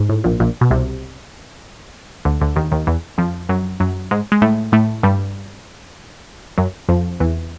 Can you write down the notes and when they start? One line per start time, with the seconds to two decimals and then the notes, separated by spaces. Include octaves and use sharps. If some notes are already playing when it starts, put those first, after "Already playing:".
Already playing: G#2
0.09 A2
0.24 A#1 A#2
0.40 A#1 A#2
0.61 B2
0.71 C2 C3
2.25 D2 D3
2.41 D2 D3
2.56 D#2 D#3
2.72 D#2 D#3
2.87 E2 E3
3.18 F2 F3
3.49 F#2 F#3
3.80 F#2 F#3
4.11 G#2 G#3
4.32 G#3
4.42 A2 A3
4.72 A2 A3
5.03 G2 G3
6.58 F#2 F#3
6.89 F2 F3
7.20 E2 E3